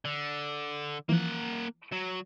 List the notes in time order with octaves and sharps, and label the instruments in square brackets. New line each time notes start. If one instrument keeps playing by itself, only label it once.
[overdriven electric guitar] D3
[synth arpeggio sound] E3 F3 [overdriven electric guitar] A#3 F#5
[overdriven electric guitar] F#3